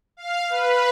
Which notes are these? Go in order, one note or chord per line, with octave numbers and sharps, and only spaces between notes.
F5
B4